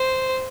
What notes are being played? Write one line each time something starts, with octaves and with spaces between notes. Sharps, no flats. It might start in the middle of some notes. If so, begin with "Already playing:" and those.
Already playing: C5